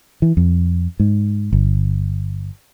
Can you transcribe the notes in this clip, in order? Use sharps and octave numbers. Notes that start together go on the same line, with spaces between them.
E3
F2
G#2
G1